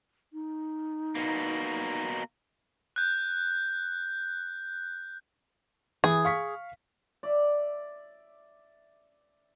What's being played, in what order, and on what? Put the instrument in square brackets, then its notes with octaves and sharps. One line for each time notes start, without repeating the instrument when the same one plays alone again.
[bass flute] D#4
[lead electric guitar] B2 A#3
[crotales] F#6 G6
[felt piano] E3 [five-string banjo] G#4
[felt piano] F5 C#6 B6
[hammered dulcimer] D5 E5